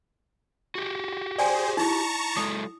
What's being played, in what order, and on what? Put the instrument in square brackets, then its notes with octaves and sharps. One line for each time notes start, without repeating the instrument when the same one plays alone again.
[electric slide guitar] F#4 G4
[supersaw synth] G#4 C5 [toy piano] D5 G5 G#5
[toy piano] D#4 E4 [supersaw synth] A5 A#5 C#6
[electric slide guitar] F#3 G#3 A4 [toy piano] D#6